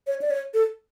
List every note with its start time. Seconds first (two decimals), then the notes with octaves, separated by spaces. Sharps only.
0.07 C#5
0.21 D5
0.31 C#5
0.54 A4